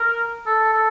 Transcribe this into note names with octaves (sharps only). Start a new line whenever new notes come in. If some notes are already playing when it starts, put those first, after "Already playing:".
Already playing: A#4
A4
A4